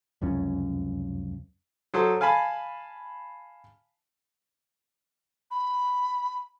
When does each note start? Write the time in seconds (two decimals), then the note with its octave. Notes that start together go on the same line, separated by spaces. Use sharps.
0.21 F1 C#2 F#2 C#4
1.94 F#3 A4 C5 D#6
2.21 F5 G#5 A5 B5
5.51 B5